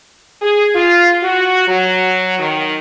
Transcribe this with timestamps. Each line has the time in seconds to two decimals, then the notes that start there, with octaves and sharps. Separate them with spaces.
0.42 G#4
0.75 F4
1.23 F#4
1.68 F#3
2.39 D#3